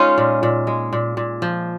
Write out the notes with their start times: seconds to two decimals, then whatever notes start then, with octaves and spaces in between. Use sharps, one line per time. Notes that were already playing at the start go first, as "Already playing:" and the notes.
Already playing: G#3 C#4 D#4 F4
0.18 A#2
0.43 A#2
0.67 G#3
0.93 A#2
1.17 A#2
1.42 F3